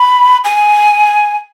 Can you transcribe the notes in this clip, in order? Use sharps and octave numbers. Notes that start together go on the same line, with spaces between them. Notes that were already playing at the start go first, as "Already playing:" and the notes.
Already playing: B5
G#5